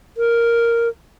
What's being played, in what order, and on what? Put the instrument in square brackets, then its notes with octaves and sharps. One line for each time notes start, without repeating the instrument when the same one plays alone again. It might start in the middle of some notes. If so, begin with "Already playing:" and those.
[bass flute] A#4